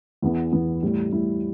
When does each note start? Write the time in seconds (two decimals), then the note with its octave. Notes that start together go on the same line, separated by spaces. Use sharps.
0.22 E2 E3 B3 E4
0.53 E2 E3 B3 E4
0.82 A2 G3 E4
1.12 A2 G3 E4